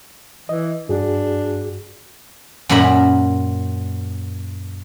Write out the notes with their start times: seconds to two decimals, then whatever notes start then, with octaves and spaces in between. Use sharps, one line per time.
0.49 E3 D#5
0.89 G2 D4 F#4 G#4
2.69 F#2 A#2 A#4 E5 B5